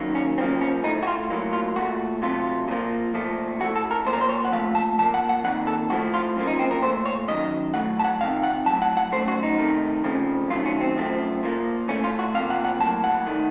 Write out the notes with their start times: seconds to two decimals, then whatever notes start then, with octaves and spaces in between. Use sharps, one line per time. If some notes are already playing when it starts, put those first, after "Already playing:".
Already playing: F#2 D#3 F#3 A#3
0.15 C#4
0.38 F#2 C#3 F3 A#3 C4
0.61 C#4
0.84 A2 A3 D#4
1.03 F#4
1.07 F4
1.30 A2 F#3 A#3
1.53 F4
1.76 A#2 A3 F#4
2.22 C3 F#3 A3 F4
2.68 A#2 F3 A#3
3.14 A#2 F3 A3
3.60 A2 F#4
3.64 A3
3.76 A4
3.91 A#4
4.06 A#2 F3 A#3 C5
4.13 A#4
4.21 C5
4.29 C#5
4.45 F#5
4.52 A#2 F3 A3 F5
4.75 A5
4.98 A#2 F3 A#3 A5
5.14 F#5
5.29 F#5
5.44 F2 D#3 A#3 F#5
5.67 A4
5.90 A2 F3 A3 F#4
6.14 F4
6.36 F#2 F3 A#3
6.47 D#4
6.59 C4
6.71 A#4
6.82 A#2 A3 C5
7.06 C#5
7.28 F#2 D#3 F#3 D#5
7.74 A2 F#3 A3 F#5
7.99 A5
8.04 F#5
8.20 F2 C3 D#3 F5
8.43 F#5
8.66 A2 F#3 A3 A5
8.82 F#5
8.97 F#5
9.12 F#2 F3 A3 C5
9.28 F#4
9.43 D#4
9.59 C3 D#3 A3
10.04 F2 C#3 F3 A3
10.50 F#2 D#3 F#3 A3 F4
10.66 C#4
10.81 C4
10.96 F#2 F3 A3
11.43 A#2 F3 A#3
11.88 A2 A3 C#4
12.04 F4
12.19 F#4
12.34 C3 F3 A#3 F5
12.50 F#5
12.65 F#5
12.80 A2 F#3 A#3 A5
13.04 F#5
13.27 D#3 A3